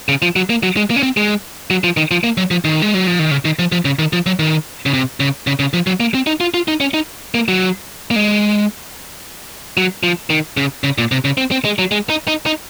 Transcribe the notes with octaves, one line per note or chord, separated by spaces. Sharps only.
C#3
F3
F#3
A#3
F#3
G#3
A#3
C#4
C4
G#3
F#3
F3
D#3
F3
A#3
F#3
F3
D#3
G#3
F#3
F3
D#3
C#3
D#3
F3
F3
C#3
D#3
F3
F#3
D#3
C#3
C3
C#3
C#3
C#3
F3
F#3
A#3
C4
D#4
F4
F4
D#4
C#4
D#4
A#3
F#3
A#3
G#3
F#3
F3
D#3
C#3
C#3
A#2
C3
C#3
C4
C4
G#3
F#3
G#3
D#4
D#4
D#4